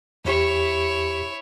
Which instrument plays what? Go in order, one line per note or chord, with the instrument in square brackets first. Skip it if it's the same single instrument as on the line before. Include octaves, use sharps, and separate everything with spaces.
[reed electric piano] E2 G4 [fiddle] E4 C#5